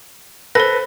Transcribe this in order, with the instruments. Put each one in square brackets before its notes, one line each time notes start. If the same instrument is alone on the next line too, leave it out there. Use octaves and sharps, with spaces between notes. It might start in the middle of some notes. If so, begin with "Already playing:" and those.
[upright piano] A4 B4 [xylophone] C5 A#6